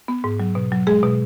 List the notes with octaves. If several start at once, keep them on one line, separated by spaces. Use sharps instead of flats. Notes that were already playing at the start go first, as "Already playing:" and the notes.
B3
G#2
F#3
B2
F#3
G#3 G#4
B2